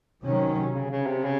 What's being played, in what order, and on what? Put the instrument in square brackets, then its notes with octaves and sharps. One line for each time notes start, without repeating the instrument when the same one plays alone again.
[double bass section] C3 F#3 C#4 [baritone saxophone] D#3
[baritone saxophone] C#3
C#3
C3
C#3